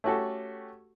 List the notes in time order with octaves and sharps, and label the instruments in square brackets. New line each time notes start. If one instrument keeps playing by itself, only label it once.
[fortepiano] A3 C#4 F#4 G4 A4